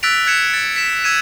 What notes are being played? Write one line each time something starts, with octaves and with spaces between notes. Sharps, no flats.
E6 F#6 A6 B6 D7 F7
F#6 G#6 C#7 E7
A6 C#7
B6 E7
E6 G#6 D#7 E7